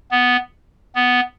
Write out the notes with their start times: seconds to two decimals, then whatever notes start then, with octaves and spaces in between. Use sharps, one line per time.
0.11 B3
0.95 B3